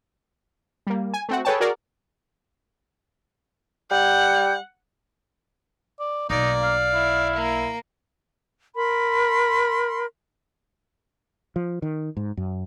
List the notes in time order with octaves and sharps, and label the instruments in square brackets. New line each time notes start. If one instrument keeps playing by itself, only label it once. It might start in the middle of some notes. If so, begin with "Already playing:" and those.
[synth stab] G3 A#3
G#5
A3 C4 F#4
G#4 A4 B4 C#5 G5 A5
F#4 G#4 A#4 D5
[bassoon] G3 [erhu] F#5 [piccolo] G6
[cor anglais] D5
[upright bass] B1 [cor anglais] A#3 [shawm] D#4 [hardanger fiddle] D5
[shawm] F5
[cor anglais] E4
[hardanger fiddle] A#3 A#5
[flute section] A#4 B5 C6
[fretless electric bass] F3
D#3
G#2
F#2